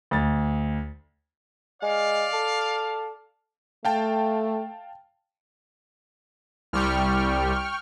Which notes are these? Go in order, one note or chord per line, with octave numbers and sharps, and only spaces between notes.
D2 A6
G#3 D5 F5
A4
A3 F5 G5 A5
C2 G3 G5 C#6 F6